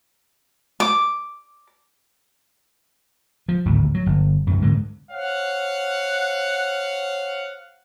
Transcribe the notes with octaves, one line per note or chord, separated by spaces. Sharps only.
D6
F3
G#1 D2 A2
F#3
G1
C2 F#2
G#2 D3 G#3
C5 C#5 F5 F#5